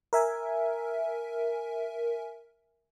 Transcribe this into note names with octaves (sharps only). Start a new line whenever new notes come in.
A#4 E5 G#5